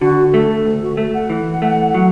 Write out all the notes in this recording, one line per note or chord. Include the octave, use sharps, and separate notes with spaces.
D3 F#4
A3 A4
D2
F#4
A3 A4
F#5
E3
A3
F#3